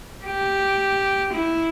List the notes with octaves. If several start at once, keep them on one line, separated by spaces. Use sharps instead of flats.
G4
E4